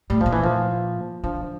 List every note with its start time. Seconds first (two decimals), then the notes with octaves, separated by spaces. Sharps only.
0.10 A2 G3
0.21 A#2 F3
0.33 E3
0.44 F3
1.23 D3 F3